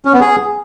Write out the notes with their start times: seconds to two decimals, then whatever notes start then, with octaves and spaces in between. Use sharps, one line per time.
0.05 C#4
0.13 B3
0.21 G#4